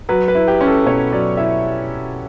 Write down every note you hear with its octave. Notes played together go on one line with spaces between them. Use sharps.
F#3 B4
B4
E4
G4
C#4
A4
B2 C#5
F#3 D5
E4 E5